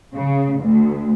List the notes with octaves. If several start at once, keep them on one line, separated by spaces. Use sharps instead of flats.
C#3
D2